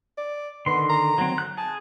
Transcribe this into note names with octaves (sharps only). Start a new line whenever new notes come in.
D5
D3 D#3 B3 C6
A#5
F#3 C4
F#6
G#4 A5